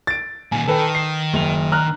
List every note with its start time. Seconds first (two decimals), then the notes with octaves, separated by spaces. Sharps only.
0.07 A6 D7
0.52 A#2 D#3 G#5
0.67 D#3 A4 B4 G5
0.95 C7
1.33 F#1 F7
1.72 A#5 F6 F#6